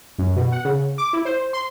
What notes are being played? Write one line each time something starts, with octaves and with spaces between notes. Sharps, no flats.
F#2
B2
F#5
C#3
D6
E4
C5
C6